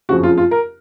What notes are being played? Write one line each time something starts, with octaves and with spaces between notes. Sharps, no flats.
F#1 F2 C#3 F3 F#4
F4
F4
A#4